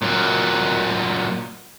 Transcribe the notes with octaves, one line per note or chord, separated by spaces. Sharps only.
A#2 F#3